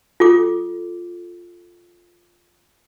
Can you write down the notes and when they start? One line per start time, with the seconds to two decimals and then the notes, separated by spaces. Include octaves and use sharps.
0.20 F4 A4 D6